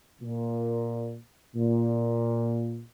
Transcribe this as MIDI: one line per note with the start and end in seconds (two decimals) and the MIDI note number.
0.21 1.16 46
1.55 2.82 46